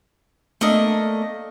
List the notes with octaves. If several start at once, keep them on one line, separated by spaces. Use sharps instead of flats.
A3 A#3 D4 D#5